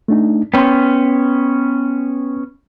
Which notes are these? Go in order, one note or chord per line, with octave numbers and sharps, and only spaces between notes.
A3 D4 D#4
B3 C#4 G5 C6